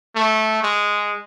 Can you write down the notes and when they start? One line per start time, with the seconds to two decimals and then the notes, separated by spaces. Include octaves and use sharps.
0.15 A3
0.63 G#3